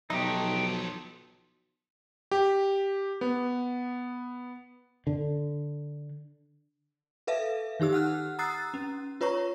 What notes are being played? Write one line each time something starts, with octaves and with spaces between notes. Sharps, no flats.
B1 F3 F#3 A3 D#4 G4
G4
B3
D3
A4 B4 E5 F5
D#3 D#4 G4 E6
F#5 F6 F#6
A#5 D#6 E6 F#6 A6 C7
C#4
F4 B4 C#5 A#5 C#6